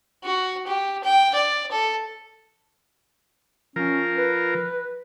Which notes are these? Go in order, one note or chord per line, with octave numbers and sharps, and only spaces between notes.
F#4
G4
G5
D5
A4
F3 C#4 A#4
B4